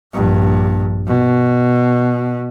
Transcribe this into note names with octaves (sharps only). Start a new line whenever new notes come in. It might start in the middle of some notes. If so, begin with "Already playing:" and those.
A#1 G2
B2